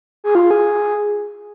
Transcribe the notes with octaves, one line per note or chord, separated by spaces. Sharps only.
G#4
F4
G#4